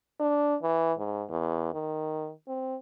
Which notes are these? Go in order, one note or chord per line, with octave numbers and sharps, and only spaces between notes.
D4
E3
G#2
E2
D#3
C4